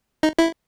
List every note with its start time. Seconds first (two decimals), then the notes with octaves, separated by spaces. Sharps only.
0.23 D#4
0.39 E4